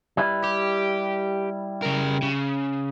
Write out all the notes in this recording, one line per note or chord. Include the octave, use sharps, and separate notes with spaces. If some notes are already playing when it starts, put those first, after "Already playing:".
G3 E4 B4
G4
C#3 A#4
C#3